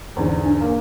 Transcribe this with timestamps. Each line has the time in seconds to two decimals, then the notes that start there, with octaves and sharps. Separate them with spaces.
0.16 E2 G#2 D3
0.46 D4
0.61 A#3